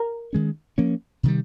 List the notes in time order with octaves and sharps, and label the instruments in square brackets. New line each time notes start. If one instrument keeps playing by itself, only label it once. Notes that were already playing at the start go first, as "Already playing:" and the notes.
Already playing: [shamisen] A#4
[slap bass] D#3 G#3 C#4
F3 A#3 C#4
C3 D#3 G3